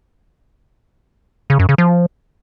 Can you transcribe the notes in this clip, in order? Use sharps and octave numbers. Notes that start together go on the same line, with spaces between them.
C#3
F#2
C#3
F3